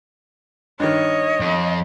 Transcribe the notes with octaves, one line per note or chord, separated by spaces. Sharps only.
G2 D#3 C#5 D#5
F2